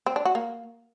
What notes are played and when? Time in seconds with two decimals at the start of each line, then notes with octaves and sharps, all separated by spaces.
0.06 C4
0.16 D4
0.25 F#4
0.35 A#3